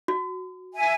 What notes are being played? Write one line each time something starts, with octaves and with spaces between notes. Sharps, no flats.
F#4
E5 G#5